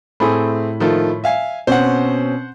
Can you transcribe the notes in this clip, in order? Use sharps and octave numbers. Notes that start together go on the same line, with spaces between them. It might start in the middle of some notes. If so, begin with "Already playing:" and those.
A2 A3 C4 G#4 B5
D#3 F3 A3
E5 F5 G#5
B2 C4 C#4 C5 F#5